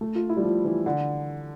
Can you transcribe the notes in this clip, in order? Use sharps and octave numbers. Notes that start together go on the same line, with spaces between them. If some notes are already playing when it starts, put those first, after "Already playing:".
A3
F4
E4
G3
F3
E3
D3